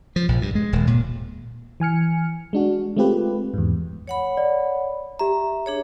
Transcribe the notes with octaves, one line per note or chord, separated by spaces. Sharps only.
F3
A#1
G2
G#3
D#1
A#2
E3 G#5 F6 C#7
G#3 D4 F#4
G#3 A3 C4 F4 G4 B4
E2 G#2
C#5 F#5 B5
D5
G4 E5 A#5
D4 G#4 C#5